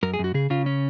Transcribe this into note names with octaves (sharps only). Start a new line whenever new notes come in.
F#2 A#4
G#4
F#2
F#4
C#3 G#4
C#3 F4
C#4